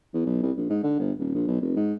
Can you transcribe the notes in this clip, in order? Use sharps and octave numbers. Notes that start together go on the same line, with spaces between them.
E2
B1
C2
A#1
G#2
D3
G1
D#1
A#1
B1
F1
G#2